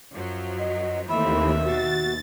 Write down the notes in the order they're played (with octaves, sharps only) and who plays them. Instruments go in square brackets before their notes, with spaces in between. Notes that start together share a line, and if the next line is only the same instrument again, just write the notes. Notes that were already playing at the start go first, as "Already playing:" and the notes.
[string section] F#2 F3 F#3
[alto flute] D#5
[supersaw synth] D#2 [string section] E3 A3 C4 [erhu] E5 [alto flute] B5
[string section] B2 [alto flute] F#4 [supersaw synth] A6